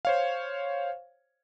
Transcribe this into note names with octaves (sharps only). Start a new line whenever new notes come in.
C5 C#5 F5